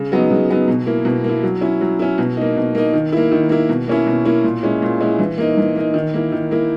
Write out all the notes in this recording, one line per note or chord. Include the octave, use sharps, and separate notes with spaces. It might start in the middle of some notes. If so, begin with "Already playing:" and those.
Already playing: C#3
F#3 B3 D#4
C#3
F#3 B3 D#4
B2
A#3 E4
B2
A#3 E4
F#3
C#4 E4
F#3
C#4 E4
B2
A#3 D#4
B2
A#3 D#4
D#3
A#3 E4
D#3
A#3 E4
B2
A#3 C#4 E4
B2
A#3 C#4 E4
A#2
G#3 C#4 E4
A#2
G#3 C#4 E4
E3
A#3 D#4
E3
A#3 D#4
D#3
A#3 E4
D#3
A#3 E4